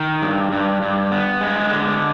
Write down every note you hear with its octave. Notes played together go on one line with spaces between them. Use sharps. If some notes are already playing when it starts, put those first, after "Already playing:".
Already playing: D#3
G2
G2
G2
B3
G#3
D3